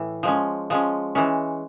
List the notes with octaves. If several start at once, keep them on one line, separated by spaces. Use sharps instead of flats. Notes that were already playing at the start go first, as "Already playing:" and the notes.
Already playing: A2 E3
F3 G#3 C#4
F3 G#3 C#4
E3 G#3 C#4